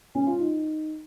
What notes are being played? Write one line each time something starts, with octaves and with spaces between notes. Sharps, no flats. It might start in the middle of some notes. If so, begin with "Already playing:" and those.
C#4
F4
D#4